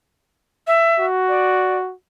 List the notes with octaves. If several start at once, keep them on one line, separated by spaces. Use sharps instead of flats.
E5
F#4
D5